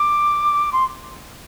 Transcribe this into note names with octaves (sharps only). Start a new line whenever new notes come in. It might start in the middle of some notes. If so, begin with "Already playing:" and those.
Already playing: D6
C6